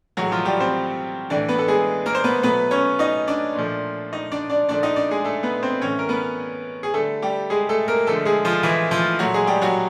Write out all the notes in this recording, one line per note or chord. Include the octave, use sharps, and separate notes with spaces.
A2 E3 F#3 G#3 F#4
F3 F4
G3 G4
C4 C5
A2 E3 A3 D4 D5
B3 B4
A4
G#3 G#4
A#3 A#4
C5
B3 B4
B2 F#3 A3 B3 B4
C#4 C#5
D#4 D#5
D4 D5
A#2 F3 A3
D#4 D#5
D4 D5
D4 D5
A#2 F3 A3 D4 D5
D#4 D#5
D4 D5
G#3 G#4
A3 A4
B3 B4
C4 C5
A2 E3 A3 C#4 C#5
A#4
B3 B4
G#4
D3 G3 A3 A4
G3 G4
G#3 G#4
A3 A4
A#3 A#4
D3 F3 G#3 A3 A4
G#3 G#4
F3 F4
E3 E4
F3 F4
A#2 F#3 A3 F#4
G#3 G#4
G3 G4
F#3 F#4